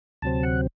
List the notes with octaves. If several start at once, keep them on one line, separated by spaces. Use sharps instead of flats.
D2 C3 F#3 C4 A5
F#5